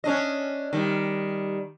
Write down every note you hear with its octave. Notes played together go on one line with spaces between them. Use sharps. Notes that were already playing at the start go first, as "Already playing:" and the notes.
C#4 D4 D#5
D#3 G3